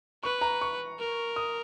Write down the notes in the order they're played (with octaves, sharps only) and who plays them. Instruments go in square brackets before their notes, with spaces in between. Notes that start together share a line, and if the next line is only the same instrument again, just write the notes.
[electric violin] B4 [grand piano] C#6
[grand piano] A#5
C#6
[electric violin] A#4
[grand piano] D#6